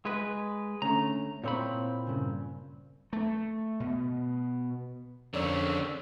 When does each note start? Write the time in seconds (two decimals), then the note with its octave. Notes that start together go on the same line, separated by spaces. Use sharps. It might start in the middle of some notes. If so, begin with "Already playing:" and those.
0.05 G#3 B4
0.82 D3 A3 C#4 A#5
1.44 A#2 C4 E4 C#5 B5
2.07 G2 C#3
3.13 A3
3.80 B2
5.34 F2 D3 C#4 A#4 C#5 D5 E6